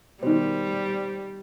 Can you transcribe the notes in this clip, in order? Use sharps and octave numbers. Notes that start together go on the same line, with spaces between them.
B2 D#3 G3 C5